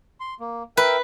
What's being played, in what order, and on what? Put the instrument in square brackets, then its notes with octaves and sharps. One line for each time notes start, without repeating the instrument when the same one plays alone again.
[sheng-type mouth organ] C6
A#3
[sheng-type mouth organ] A#4 E5 G5 [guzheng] B4